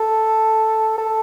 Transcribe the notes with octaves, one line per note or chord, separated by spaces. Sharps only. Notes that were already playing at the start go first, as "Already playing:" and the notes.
Already playing: A4
A4